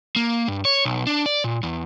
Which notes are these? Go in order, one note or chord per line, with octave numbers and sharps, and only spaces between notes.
A#3
G2
C#5
B1
D4
D5
A#2
E2